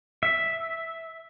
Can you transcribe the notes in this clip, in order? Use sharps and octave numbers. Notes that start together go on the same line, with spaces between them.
E5